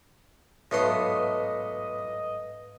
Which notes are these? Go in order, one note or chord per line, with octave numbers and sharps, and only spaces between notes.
B1 G#2 A3 B3 B4 D#5 F5 C6